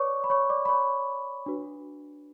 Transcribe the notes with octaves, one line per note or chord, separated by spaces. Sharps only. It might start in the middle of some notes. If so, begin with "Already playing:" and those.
Already playing: B4 C#5 D5 C#6 D6
B5
C#5 C#6
D5 D6
B5
C#5 C#6
D4 F#4 B4